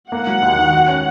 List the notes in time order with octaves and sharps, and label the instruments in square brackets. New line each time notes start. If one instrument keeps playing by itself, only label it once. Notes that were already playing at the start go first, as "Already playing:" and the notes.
[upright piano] A#3 [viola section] F#5
[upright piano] F#3
D#2
D#3
F#4
C#4